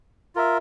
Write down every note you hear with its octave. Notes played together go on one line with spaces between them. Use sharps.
F4 A#4 E5